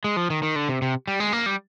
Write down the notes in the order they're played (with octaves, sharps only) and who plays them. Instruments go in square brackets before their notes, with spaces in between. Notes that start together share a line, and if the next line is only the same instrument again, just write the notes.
[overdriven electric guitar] G#3
F3
D#3
D#3
D3
C3
C3
G3
G#3
A#3
G3